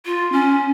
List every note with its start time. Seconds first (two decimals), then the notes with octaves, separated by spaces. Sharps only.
0.06 F4
0.32 C#4